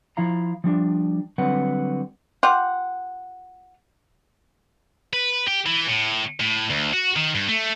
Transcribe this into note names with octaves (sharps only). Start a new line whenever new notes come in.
F3 E4 F5 A#5
F3 G3 D4
D3 F#3 G3 C4 B4 F#5
F4 G4 F#5
B4
G4
E3
A2
A2
D2
F#4
D#3
G2
A3